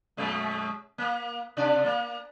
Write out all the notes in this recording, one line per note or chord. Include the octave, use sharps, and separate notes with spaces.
F#2 B2 G#3
A#3
C3 D4 D5
A#3